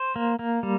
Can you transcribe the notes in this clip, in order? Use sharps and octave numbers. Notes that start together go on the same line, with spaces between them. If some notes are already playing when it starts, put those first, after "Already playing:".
Already playing: C5
A#3
A#3
G3